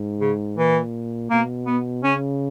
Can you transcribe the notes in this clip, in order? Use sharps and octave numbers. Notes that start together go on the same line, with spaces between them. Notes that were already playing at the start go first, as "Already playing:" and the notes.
Already playing: G#2
C#3
A#2 E3
B2 A#3
B3
C#3 C#4